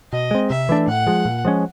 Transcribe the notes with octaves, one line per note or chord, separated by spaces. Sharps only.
B2 D#5
G#3 C4
C3 E5
E3 A3 D4
A2 F#5
F3 G#3
A#2
F3 G#3 C#4